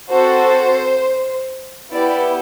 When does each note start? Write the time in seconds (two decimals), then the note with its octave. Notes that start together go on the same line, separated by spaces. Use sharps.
0.11 C4 F#4 A4 C5
1.92 B3 E4 G4 D5